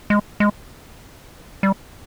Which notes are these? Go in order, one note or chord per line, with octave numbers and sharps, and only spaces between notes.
G#3
G#3
G3